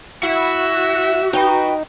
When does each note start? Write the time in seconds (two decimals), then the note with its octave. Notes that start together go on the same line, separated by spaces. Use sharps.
0.23 E4 F#4 E5
1.33 D#4 B4 G5